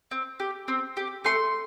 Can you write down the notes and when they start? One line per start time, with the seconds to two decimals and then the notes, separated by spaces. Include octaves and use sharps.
0.11 C4
0.40 G4
0.68 C4
0.97 G4
1.25 A3 C6